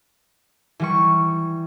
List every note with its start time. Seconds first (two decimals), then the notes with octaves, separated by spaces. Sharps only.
0.80 E3 G3 C#6